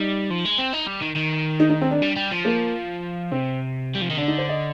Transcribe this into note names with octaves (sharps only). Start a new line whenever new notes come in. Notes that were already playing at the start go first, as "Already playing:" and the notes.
Already playing: G3 D#4
F3
G#3
C4
D#4
G3
D#3
D#3
D#4
D#4
C4
D4
G3
G3
F3
A#3
C3 C4
G3
F3
D#3
D3 D4
D#4
C5
D#5